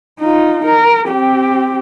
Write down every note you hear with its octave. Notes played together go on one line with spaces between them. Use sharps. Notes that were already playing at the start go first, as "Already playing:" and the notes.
D#4 F4
A#4
C4 G4